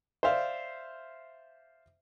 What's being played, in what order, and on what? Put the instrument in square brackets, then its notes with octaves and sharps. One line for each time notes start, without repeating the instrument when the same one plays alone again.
[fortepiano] C5 D5 E5 F5